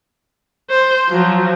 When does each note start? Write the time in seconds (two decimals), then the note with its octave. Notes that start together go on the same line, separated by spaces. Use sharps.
0.70 C5
1.08 F3 F#3